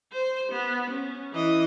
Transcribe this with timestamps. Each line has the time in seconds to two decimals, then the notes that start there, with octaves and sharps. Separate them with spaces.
0.12 C5
0.52 B3
0.90 C#4
1.33 E3 D#5